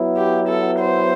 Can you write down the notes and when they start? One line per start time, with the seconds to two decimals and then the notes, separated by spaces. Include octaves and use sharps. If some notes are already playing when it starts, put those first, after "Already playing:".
Already playing: F#3 B3 E4
0.17 G4
0.49 A4
0.80 C5